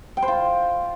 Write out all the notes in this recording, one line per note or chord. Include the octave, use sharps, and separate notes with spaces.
G5
C5
F4